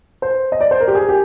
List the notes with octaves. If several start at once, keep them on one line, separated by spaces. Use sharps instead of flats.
C5
D#5
D5
C5
A#4
G4
G#4
G4